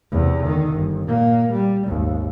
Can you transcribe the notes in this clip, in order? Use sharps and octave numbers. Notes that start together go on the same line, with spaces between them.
E2 C3
D3 D#3
G1
A#2 A#3
G3
G#1 D#2